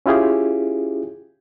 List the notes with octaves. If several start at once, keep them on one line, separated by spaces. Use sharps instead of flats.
C#4 E4 F4 G4 G#4